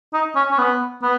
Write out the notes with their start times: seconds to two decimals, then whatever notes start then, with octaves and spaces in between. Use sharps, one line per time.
0.13 D#4
0.36 C#4
0.51 C#4
0.59 B3
1.03 B3